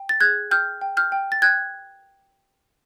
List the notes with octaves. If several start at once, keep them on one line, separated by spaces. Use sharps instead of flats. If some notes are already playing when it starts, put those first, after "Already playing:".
Already playing: G5
A6
G#4 F#6 G#6
G5 F6 G6
G5
F6 G6
G5
A6
G5 F#6 G#6